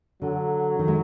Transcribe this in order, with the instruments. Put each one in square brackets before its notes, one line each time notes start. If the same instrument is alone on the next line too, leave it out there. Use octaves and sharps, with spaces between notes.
[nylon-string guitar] D3 [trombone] F#3
[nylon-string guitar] D#3
G#3